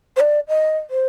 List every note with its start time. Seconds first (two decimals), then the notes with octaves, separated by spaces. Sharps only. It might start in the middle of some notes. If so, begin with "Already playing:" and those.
0.16 C5
0.20 D5
0.48 D#5
0.90 C5